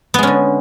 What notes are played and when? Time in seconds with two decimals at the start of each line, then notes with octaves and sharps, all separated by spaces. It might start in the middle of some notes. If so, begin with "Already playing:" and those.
0.14 B3
0.18 G#3
0.23 C#4
0.27 D3